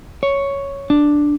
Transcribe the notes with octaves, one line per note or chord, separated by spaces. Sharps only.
C#5
D4